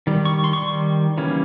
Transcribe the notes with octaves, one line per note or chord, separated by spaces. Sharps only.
D#3 G3
C#6
C6
C#6
D#3 G3
C#3 E3 G3 A#3 C#4